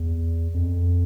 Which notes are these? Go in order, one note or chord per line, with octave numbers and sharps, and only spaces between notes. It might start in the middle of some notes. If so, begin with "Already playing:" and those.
Already playing: E2
F2